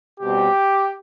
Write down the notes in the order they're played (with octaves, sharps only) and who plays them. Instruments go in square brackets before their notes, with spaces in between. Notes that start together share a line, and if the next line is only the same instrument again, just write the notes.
[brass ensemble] B2 G3 C4 G4